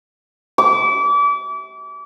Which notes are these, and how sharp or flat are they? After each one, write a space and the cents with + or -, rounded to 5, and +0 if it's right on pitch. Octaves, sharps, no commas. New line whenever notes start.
D6 -35